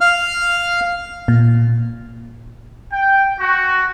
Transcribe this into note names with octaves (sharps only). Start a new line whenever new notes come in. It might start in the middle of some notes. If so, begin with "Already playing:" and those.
F5 F6
A#2
G5
F#4